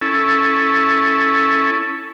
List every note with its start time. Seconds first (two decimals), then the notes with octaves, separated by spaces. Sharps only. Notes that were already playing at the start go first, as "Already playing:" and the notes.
0.01 C#4 E4 A4